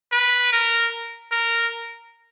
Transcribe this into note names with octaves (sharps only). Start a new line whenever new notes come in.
B4
A#4
A#4